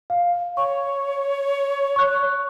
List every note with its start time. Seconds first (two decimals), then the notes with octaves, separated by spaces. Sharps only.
0.10 F5
0.57 C#5 C#6
1.96 C#6 F#6